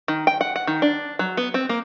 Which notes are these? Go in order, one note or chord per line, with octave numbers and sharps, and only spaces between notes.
D#3
G5
F#5
F#5
D#3
D4
F#3
B3
C4
A#3